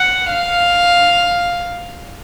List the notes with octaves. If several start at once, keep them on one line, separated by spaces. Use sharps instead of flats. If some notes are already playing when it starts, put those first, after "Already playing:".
Already playing: F#5
F5